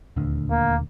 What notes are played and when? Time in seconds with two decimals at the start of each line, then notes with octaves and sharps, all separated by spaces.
0.16 D#1 D2 D3
0.50 A#3